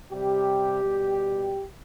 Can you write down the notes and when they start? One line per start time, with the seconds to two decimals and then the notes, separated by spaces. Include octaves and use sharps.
0.10 C3 G3 G4
0.82 B2 G3